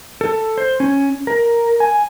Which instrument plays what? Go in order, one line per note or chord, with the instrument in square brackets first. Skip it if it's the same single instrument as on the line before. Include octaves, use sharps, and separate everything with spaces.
[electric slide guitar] A4
C5
C#4
A#4
G#5